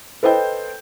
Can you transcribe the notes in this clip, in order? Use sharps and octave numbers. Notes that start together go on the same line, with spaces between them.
A4 B4 C5 D#5 G5 G6